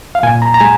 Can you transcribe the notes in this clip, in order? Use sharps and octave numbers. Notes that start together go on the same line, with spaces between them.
F5
A#2 G#5
A#5
A#5
G#3 G#5